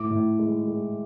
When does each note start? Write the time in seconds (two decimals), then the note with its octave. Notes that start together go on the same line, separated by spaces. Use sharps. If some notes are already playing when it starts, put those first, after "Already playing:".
Already playing: A2 D6
0.11 A2
0.39 G#3
0.67 G#3